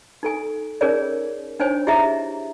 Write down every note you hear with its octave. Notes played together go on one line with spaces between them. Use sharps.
D#4 A4 G#5
C#4 D#4 G#4 A#4 C#5 D5
D4 D#4 C5 C#5 G#5
E4 G4 G#4 D#5 E5 A#5